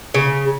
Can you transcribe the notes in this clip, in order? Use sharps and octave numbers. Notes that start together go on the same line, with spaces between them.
C#3